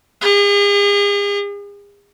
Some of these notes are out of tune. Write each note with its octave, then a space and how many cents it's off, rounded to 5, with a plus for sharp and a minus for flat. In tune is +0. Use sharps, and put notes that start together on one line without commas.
G#4 -40